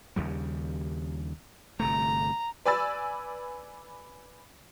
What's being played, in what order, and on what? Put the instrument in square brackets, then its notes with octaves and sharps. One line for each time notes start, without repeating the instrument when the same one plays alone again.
[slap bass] D#2 C#3 G3
[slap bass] G1 C3 A3 [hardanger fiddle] A#5
[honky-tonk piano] B4 D5 G#5 B5 E6 A6